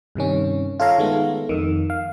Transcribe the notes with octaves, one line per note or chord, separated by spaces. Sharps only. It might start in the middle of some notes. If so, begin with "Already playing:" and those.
G2 C3 D#3 C#4
F4 A4 C#5 F5 A#5
D#3 G#3 A3 B3
F2 D#3
F5